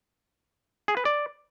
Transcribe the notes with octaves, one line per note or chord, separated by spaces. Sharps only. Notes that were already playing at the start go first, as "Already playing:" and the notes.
G#4
B4
D5